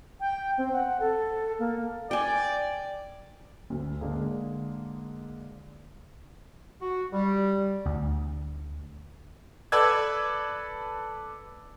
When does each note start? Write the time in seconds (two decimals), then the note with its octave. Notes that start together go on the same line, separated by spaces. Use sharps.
0.20 G5
0.58 C4
0.73 F#5
1.00 A4
1.59 A#3
2.11 D5 G5 G#5
3.70 D2
4.01 D3 G#3 A#3
6.80 F#4
7.12 G3
7.86 D2
9.72 A4 B4 D5 A5 E6 G#6